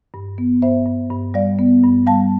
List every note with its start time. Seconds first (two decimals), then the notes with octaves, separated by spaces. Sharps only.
0.14 G2
0.38 B3
0.62 G2 C5 E5
0.86 G2
1.10 G2
1.34 G3 D5 F5
1.59 B3
1.83 G2
2.07 G3 F5 A5